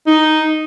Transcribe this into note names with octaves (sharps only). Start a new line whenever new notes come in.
D#4